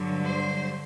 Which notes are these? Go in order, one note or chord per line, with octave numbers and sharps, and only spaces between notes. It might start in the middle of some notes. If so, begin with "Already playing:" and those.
Already playing: G2 D3 F#3
C5